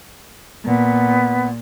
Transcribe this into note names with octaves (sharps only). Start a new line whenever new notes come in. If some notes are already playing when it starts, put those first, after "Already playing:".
A#2 B3